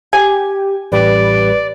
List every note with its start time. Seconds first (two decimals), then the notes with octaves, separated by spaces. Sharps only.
0.13 G4 G#5
0.92 A1 G3 G4 B4 D5